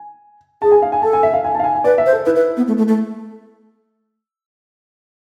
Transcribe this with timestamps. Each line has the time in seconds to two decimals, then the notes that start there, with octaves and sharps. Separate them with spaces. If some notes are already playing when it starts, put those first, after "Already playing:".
Already playing: G#5
0.62 G#4 A5
0.72 G#5
0.82 F5
0.92 G#5
1.02 A4 A5
1.13 G#5
1.23 E5
1.33 F5
1.44 G#5
1.55 A5
1.60 F5
1.64 G#5
1.75 G#5
1.84 B4 D5
1.98 E5
2.06 C5
2.13 A4
2.25 E4 B4
2.36 B4
2.57 B3
2.68 A3
2.78 A3
2.88 A3